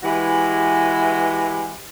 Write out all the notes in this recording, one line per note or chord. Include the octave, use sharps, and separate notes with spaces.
E3 G#3 E4 F#4 G4 B4